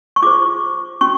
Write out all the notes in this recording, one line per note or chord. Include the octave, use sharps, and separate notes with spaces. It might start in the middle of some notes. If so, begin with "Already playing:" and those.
C#6
F4 G#4 C5 D6
C#4 F#4 C#6